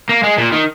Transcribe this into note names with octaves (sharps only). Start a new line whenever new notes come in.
A#3
G#3
A#2
D#3